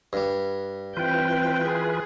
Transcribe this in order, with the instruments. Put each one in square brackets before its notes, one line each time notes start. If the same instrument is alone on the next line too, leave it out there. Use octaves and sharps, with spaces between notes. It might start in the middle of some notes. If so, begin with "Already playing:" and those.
[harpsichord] G2 G3
[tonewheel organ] E3 F4 B4 [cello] C4 G5
[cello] G#4